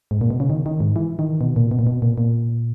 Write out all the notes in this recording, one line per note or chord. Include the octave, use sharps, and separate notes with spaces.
G#2
A#2
B2
C#3
D#3
D#3
G#2
E3
D#3
B2
A#2
B2
A#2
B2
A#2
A#2